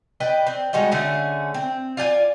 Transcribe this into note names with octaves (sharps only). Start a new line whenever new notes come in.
B4 D5 D#5 G5
C4
G3 G#3 F#4 D#5
D3 A3 C#4 G#4
C4
F4 D5 G5 G#5